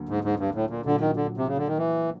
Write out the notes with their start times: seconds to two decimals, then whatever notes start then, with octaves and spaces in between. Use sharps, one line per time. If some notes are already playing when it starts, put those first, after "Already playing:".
Already playing: D2 D3 F#3 A#3
0.09 G#2
0.24 G#2
0.39 G2
0.55 A2
0.70 A#2
0.85 A#1 A#2 D3 F#3
1.00 D#3
1.16 D3
1.38 C3
1.48 C#3
1.58 D3
1.68 D#3
1.78 E3